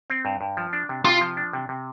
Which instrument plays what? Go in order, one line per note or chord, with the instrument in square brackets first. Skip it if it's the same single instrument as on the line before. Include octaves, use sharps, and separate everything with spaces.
[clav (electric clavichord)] C4
G2
G2
F3
D4
C3
[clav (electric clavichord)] C3 [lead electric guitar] F4
[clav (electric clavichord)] F3
D4
C3
C3